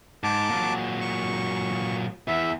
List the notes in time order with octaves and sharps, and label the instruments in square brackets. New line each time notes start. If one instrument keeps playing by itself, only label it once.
[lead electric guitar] G#2 [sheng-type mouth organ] A5 D6
[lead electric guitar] A#2 F#3
[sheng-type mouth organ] C#6
[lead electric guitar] E2 E3 [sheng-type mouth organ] E5